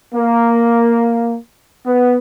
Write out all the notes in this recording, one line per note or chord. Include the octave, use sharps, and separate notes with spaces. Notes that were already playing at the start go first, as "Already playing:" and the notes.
A#3
B3